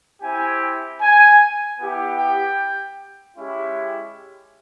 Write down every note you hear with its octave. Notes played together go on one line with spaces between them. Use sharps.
C4 E4 G4 G#5
G#5
B3 E4 G4
G5
G#3 C#4 E4 G4